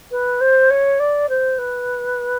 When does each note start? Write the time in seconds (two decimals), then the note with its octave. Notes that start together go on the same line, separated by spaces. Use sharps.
0.11 B4
0.41 C5
0.70 C#5
1.00 D5
1.29 C5
1.58 B4